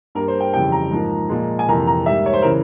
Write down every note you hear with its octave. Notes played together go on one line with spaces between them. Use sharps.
G2 G3 A#3 A#4
C5
G5
F2 C#3 E3 G3 G5
A#5
G#2 F3 A#3
A#2 F3 G#3
G#5
F2 C3 E3 A#3 A#5
A#5
G#2 G3 A#3 E5
C#5
C5
C#3 E3 A#4